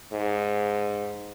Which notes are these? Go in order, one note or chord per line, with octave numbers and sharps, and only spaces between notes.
G#2